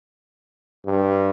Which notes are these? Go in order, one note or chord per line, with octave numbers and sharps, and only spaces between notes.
G2